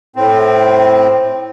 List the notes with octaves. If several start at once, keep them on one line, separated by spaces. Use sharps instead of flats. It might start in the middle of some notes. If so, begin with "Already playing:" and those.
A2 C4